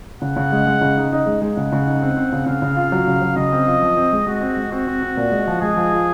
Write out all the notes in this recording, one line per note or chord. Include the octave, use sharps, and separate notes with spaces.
C#3 F#5
C#3
G#3
G#3
C#3
D#4
D#4
G#3
G#3
C#3 F#5
C#3
D#4
C4
C4
C#3
C#3 F5
C#3
F4
F#3
C#3
F#3
C#3 D#5
C4
F4
F3
C4
G#3
G#3 F#4
C4
G#3
C4 F#4
C4
C4
A#2
G#3
F3
G#3 G#4
F3
F4